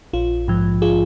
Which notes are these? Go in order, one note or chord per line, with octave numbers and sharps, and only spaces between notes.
A#1 F4
G#2 F3
F4 G#4